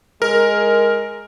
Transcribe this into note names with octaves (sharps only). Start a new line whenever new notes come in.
G#3 A#4